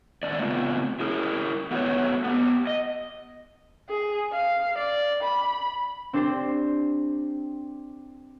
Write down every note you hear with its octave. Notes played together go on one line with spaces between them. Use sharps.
A2 D3 D#3 A3 C#4 D5
C#3 A3 B3 C4 F4
E4 G#4 A#4
A3 B3 F#4 A4 B4 C#5
B3 G4
D#5
G#4
F5
D5
B5
C4 D4 G4 C5